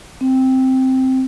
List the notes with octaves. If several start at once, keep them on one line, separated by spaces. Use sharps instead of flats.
C4